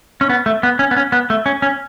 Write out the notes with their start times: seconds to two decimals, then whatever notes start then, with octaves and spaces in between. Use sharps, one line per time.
0.21 C#4
0.30 B3
0.46 A3
0.63 B3
0.79 C#4
0.91 B3
0.96 C#4
1.12 B3
1.30 A3
1.46 C#4
1.62 C#4